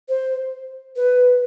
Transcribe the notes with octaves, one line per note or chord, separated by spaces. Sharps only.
C5
B4